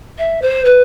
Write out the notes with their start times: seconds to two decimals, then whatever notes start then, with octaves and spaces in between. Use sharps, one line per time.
0.18 E5
0.41 C5
0.64 B4